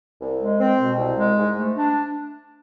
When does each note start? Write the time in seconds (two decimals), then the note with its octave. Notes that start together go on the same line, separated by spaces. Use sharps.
0.20 C2
0.40 G#3
0.59 C4
0.79 B2
0.98 C2
1.17 G#3
1.38 G#2
1.57 A3
1.77 D4